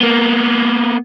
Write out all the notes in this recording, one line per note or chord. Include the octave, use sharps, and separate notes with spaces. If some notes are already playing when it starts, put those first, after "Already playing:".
A#3 B3